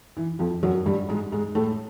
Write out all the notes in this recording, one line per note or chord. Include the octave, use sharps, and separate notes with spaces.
E3
F2 F3
F#2 F#3
G2 G3
G#2 G#3
G#2 G#3
A2 A3